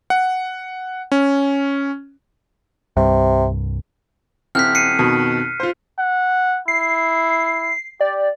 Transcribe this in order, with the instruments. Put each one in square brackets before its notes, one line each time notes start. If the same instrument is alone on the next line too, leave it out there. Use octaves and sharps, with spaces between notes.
[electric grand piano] F#5
C#4
[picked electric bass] C2 G2 [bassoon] C3
[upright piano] D#1 C4 E4 [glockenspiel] F6 F#6 B6
[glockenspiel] C7 C#7 D#7
[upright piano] F2 B2 D#3
F4 C5
[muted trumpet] F#5
[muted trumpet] E4 [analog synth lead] C7
[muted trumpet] G4 [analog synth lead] D5